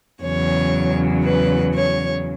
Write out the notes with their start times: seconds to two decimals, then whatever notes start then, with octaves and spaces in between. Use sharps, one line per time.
0.22 E2 C#3 F#3 C#5
1.24 B4
1.75 C#5